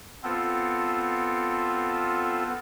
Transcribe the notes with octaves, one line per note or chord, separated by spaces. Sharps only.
B3 C4 F4 A4